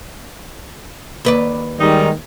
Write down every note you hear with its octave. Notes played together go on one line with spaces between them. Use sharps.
D#2 B4 D5
D#3 G3 G#3 D#4